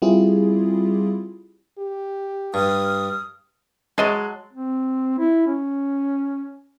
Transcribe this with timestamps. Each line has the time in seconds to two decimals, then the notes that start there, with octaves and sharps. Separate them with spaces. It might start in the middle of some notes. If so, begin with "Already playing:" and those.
0.02 G3 C4 E4 F4 G4 G#4
1.78 G4
2.54 G2 D#6 F6
3.98 F#3 G#3 D#5 A5
4.53 C4
5.19 E4
5.47 C#4